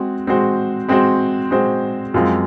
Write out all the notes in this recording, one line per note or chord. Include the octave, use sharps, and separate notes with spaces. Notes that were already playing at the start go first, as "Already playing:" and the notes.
Already playing: G#3 C4 F#4
G#3 C4 F#4 C5
G#3 C4 F#4 C5
G#3 C4 F#4 C5
F#2 F3 G#3 C4 F4